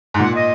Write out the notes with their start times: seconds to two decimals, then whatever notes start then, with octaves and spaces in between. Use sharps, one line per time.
0.14 G#2
0.19 A#2 F#5
0.34 D#5